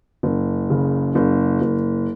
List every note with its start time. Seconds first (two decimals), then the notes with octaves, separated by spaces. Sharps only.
0.23 F#1
0.70 C#3
1.15 F#1
1.61 F#1